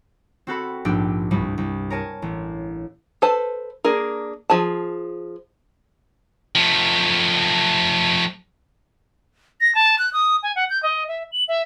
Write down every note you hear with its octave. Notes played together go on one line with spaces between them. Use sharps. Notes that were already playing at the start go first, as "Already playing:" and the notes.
C4 F#4 A4 B5
A#1 G#2 B3 D4 G4 E6
C2 G2 G3
C2
A#4 C#5 G#5 A5
A1
A4 B4 C5 A5
A#3 D4 G#4 A#4
F3 G#4 A5
F3 A3
A#6
A5
F#6
D#6
G#5
F#5
G6
D#5
E5
F#7
E5